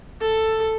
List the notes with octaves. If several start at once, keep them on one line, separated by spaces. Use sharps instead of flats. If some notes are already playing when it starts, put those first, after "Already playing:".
A4